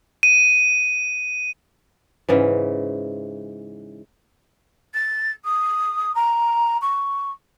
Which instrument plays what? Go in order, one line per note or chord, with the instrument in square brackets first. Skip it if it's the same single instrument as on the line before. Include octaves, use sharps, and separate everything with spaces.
[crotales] D#7
[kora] G#2 C#3 E3
[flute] A6
D#6
A#5
C#6